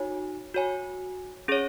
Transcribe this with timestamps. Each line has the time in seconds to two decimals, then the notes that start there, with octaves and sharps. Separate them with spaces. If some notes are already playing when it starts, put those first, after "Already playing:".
Already playing: D#4 F#4 C#5 G#5
0.54 F#4 C#5 G#5
1.48 C#4 G#4 C#5